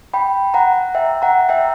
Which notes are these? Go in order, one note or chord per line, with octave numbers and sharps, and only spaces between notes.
G5 B5
F#5 A#5
E5 G5
F#5 A#5
E5 G5